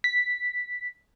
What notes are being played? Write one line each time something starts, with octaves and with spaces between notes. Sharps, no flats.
B6